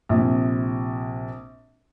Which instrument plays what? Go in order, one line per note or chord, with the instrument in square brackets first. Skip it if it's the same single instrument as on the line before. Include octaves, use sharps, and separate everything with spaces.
[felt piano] A#1 C3